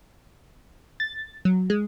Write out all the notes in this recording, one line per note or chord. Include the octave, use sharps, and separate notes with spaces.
A6
F#3
G#3